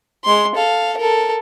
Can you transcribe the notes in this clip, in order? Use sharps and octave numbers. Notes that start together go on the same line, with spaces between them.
G#3 C6
A4 F5
A4 A#4